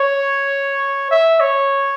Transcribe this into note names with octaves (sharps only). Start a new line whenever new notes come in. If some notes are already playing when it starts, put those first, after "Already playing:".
Already playing: C#5
E5
C#5